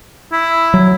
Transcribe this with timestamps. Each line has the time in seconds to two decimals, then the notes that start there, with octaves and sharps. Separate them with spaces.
0.32 E4
0.74 F#3